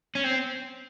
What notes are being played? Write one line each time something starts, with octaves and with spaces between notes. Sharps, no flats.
C#4
C4